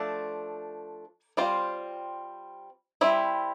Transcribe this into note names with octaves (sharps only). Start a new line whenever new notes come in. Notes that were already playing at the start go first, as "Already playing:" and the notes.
Already playing: F3 A3 D4 A4
G3 C4 F4 C5
G3 C4 E4